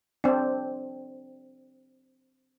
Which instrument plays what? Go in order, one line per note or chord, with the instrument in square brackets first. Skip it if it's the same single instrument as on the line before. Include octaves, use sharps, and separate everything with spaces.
[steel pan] C4 D4